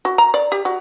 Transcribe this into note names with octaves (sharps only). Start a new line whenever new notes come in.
F#4
A#5
D5
G4
F#4